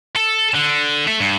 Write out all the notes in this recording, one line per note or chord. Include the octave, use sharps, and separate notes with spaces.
A4
D3
A3
G2